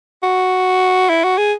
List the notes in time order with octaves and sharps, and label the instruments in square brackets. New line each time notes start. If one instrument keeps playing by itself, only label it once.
[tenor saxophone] F#4
E4
F#4
G#4